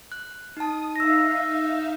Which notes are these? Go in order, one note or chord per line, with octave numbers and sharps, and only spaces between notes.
F#6
D#4 A5 D#6
D#4 E5 F5 E6 A#6